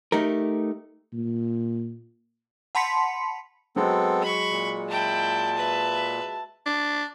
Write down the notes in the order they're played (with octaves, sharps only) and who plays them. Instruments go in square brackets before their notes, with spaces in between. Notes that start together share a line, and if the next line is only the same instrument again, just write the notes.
[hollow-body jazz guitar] A3 D#4 G4 A#4
[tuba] A#2
[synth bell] F#5 A5 B5 C6 B6 C#7
[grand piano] F#3 G#3 [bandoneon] B3 C4 A4
[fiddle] B5 C#6
[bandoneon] A#2
[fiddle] E4 G5 [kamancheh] A5
[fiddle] B4 E5
[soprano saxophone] D4